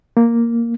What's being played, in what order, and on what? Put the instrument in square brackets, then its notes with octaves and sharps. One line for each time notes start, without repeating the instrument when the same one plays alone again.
[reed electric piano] A#3